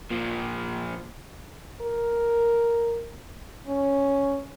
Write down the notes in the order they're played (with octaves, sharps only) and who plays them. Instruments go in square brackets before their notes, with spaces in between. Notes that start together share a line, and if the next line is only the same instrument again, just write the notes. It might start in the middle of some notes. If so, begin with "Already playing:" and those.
[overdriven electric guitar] A#2 F3
[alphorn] A#4
C#4